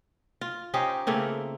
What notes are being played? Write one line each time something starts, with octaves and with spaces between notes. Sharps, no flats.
F4
C#4 D#4 G4 C5
C#3 A3 A#3 C4